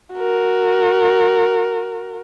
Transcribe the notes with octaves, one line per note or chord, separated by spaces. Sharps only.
F#4 A#4